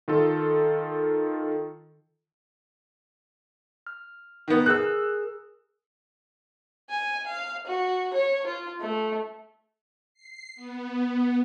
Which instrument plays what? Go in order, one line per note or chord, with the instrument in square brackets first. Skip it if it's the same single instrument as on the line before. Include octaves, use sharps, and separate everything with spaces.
[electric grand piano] D#3 F4 A4
[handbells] F6
[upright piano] D#3 B3
[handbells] G#4 A#4 [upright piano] E6 F#6
[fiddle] G#5
F5
F#4
C#5
F4
A3
[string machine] C7
B3